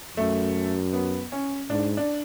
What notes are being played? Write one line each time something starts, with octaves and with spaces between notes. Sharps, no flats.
F#2 A3
B3
C#4
G#2 D4
D4